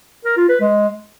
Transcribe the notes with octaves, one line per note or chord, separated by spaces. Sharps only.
A#4
F4
B4
G#3